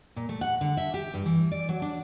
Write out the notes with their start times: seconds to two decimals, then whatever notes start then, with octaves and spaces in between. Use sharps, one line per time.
0.16 A#2
0.29 A3
0.41 F#5
0.61 D3
0.77 E5
0.94 G4
1.14 G2
1.26 E3
1.52 D5
1.69 F#3
1.82 D4